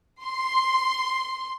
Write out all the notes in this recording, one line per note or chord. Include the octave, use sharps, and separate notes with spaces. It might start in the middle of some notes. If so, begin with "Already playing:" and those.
C6